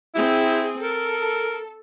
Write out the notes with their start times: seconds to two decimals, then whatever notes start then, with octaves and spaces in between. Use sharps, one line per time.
0.15 C4 E4 G#4
0.83 A4 A#4